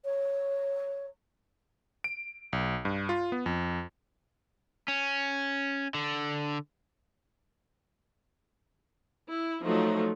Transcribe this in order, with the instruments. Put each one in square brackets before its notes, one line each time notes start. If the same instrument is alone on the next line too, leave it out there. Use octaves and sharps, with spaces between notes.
[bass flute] C#5
[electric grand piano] D7
B1
G2
F4
B3
F2
[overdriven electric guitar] C#4
D3
[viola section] E4
F3 F#3 A3 D#4